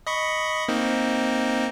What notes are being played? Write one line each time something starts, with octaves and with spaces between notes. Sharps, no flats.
D#5 B5 C#6
A#3 C4 D#4